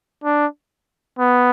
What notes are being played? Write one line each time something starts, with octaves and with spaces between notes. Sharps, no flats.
D4
B3